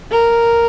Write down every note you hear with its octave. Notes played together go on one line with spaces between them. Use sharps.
A#4